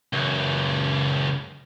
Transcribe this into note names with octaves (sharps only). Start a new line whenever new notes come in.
C#2 F#2